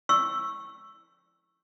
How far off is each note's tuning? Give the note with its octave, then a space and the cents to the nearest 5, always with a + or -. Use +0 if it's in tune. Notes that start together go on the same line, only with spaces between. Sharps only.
C#6 -15 E6 +5